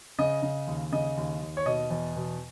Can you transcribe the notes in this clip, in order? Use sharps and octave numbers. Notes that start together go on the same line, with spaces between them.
C#3 D#5
C#3
D#2
C#3 D#5
D#2
D#2
C#5
B2 D#5
E2
B2